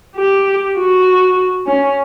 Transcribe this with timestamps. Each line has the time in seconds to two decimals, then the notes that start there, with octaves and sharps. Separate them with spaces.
0.17 G4
0.77 F#4
1.67 C#4